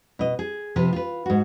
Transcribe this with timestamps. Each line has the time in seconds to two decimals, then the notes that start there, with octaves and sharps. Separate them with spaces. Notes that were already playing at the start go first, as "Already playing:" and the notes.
0.19 B2 D#5
0.39 G#4
0.76 C3 F3 B4
0.93 F4 B4
1.26 G#2 F#4